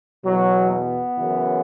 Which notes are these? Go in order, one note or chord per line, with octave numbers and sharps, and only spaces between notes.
E2 B2 F#3
B3
F#2 C#3 E3